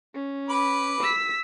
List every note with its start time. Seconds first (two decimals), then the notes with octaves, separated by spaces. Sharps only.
0.15 C#4
0.49 B4 B5 D6
1.01 E6 B6